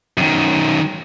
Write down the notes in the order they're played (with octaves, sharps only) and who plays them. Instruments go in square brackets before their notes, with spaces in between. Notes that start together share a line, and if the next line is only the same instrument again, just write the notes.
[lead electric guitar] F#2 D#3